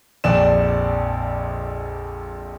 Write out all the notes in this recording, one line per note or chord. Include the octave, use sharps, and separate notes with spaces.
A#1 F2 D5 E7